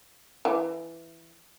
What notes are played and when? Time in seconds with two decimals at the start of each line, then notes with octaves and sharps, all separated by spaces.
0.45 E3